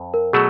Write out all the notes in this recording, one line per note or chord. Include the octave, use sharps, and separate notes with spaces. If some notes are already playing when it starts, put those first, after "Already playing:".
Already playing: F2
A#4
B2 F#3 A3 G#4